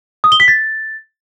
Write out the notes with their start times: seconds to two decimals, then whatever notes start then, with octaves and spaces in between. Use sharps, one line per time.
0.24 D#6
0.32 G7
0.40 B6
0.48 A6